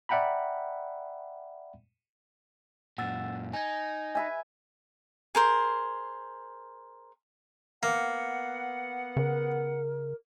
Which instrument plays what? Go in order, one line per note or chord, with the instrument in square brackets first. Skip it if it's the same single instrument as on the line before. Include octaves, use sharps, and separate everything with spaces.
[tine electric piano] D5 E5 F#5 G5 A#5 B5
[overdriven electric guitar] F#2 A#2 [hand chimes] F#5 E6 A6
[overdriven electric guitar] D#4 [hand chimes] G#5 G#6
[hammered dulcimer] B4 E5 G#5
[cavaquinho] G#4 A#4 C5
[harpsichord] A#3 [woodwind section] B3 F#5
[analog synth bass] C#3 [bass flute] A#4